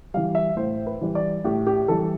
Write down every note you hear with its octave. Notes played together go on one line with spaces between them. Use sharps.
E3 G3 F5
E5
A2 C5
B4
E3 G3
D5
A2 G4
G4
E3 G3 A4